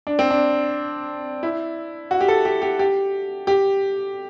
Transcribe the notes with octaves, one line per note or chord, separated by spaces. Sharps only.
D4
C4
D4
E4
F#4
G4
A4
G4
G4
G4
G4